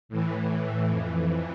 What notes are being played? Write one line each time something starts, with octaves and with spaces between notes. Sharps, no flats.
A2 E3
F2 E3